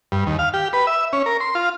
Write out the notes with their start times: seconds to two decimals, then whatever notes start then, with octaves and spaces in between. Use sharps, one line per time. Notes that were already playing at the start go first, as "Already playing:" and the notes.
0.12 G2
0.27 D#2
0.39 F5
0.54 G4
0.73 B4
0.87 E5
1.13 C#4
1.26 A#4
1.40 C6
1.55 F4